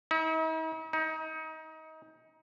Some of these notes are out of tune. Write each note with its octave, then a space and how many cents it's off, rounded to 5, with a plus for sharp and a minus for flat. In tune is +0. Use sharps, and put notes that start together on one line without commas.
D#4 +45
D#4 +25